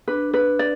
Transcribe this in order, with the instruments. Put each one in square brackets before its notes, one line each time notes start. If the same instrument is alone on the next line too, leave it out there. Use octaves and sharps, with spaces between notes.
[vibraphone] D4 [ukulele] B4
[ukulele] B4
D5